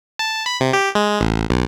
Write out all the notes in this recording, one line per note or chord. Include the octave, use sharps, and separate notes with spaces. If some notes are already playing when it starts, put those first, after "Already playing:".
A5
B5
C3
G4
G#3
A1
B1